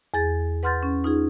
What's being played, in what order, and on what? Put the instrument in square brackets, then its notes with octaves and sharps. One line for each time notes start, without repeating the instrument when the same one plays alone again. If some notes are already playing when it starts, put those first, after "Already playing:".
[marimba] E2 G#4 A6
B4 F#5 C6 F6 G6 A6
C#4
D#4 F4 G#4